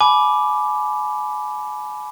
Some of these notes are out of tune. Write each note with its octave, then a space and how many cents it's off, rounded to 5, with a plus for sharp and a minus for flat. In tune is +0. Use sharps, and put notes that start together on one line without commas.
G#5 +35 B5 +0 D6 +0